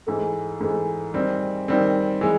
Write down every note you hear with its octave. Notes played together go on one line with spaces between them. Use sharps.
G#2 E3 A3
G#2 E3 A3
D#3 G3 C4
D#3 G3 C4
E3 G#3